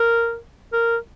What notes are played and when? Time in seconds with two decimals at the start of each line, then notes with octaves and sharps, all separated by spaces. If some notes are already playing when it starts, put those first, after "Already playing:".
Already playing: A#4
0.73 A#4